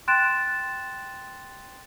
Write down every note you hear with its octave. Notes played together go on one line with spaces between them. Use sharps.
G5 C6 F#6 A6 D7 E7